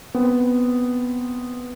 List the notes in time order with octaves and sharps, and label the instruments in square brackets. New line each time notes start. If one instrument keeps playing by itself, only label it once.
[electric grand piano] B3 C4